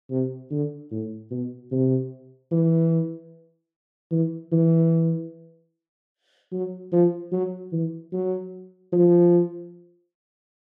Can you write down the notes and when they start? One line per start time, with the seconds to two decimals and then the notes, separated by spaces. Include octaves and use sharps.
0.10 C3
0.51 D3
0.91 A2
1.31 B2
1.71 C3
2.51 E3
4.11 E3
4.52 E3
6.53 F#3
6.92 F3
7.32 F#3
7.72 E3
8.13 F#3
8.92 F3